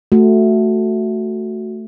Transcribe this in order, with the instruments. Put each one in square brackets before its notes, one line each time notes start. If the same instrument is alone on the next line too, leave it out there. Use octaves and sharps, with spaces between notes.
[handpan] A3 [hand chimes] F#4